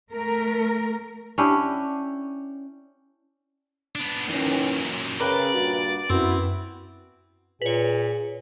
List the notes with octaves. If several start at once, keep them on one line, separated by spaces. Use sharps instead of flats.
A3 A#4
C#4 D4 E4 G4
B3 D4
F#2 A#2 D#3 E3 C#4
C#3 A#4 B4 D5 G5
G2 A#2 F#4
F#2 B3 C4 E4 F#4
A#2 G#4 B4 C#5